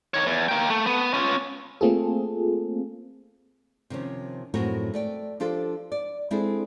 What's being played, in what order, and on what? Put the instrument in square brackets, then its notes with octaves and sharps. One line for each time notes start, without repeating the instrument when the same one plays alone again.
[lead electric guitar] D#3 C#5
E2
A#3 G5
A3
B3
C#4 F4
[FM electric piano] A3 A#3 C4 F4 G#4 A4
[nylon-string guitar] C3 D#3 F3 C#4
F#2 A2 F3 C4 F#4 A#4
A3 D5 G5
F3 D4 F4 G4 A4
D5
G#3 C4 D4 E4 G#4 A4